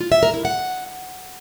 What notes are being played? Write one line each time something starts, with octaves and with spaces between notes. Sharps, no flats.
F4
E5
A#4
E4
F#5